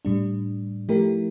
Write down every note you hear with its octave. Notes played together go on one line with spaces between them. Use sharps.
A2 G3 D4
F3 A3 E4 G4 A#4